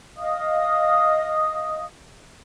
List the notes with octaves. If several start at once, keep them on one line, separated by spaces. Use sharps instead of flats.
D#5 F5 D#6